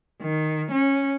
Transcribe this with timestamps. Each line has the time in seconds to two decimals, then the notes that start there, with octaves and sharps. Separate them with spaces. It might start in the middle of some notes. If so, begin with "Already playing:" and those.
0.22 D#3
0.72 C#4